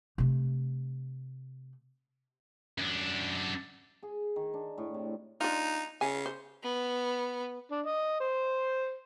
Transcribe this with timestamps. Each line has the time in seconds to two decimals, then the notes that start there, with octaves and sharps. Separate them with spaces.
0.18 C3 A3
2.78 F#2 D4
4.03 G#4
4.36 D#3
4.54 D4
4.78 A2
4.94 C3
5.41 D4 D#4 F4
6.01 C#3 G#5
6.26 C5
6.63 B3
7.71 D4
7.86 D#5
8.20 C5